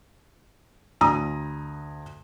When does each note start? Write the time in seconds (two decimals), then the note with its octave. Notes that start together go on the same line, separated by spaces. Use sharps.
1.01 D2 A#5 D#6